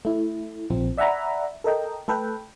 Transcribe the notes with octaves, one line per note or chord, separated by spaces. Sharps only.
A3 E4
A#1 F3 C4
D5 E5 F#5 G#5 A#5 B5
A4 A#4 D#5 G5
A3 A4 B4 G5